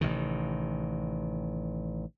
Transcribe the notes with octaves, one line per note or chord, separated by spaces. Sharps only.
A1 C3 D#3